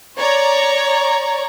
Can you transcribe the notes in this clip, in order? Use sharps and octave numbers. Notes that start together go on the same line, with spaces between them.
C#5 D5 A#5